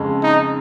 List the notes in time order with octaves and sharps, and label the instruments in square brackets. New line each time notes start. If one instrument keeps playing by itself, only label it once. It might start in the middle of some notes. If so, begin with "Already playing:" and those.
Already playing: [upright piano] F2 C#3 G#3
[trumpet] D#4